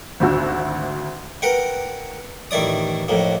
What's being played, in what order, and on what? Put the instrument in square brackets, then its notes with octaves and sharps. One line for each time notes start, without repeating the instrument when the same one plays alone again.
[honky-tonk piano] G#1 D2 D3 F#4 E6
[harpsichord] A#4 B4 F#5 G5
A1 D#3 E4 D5 D#6
F2 A2 A#3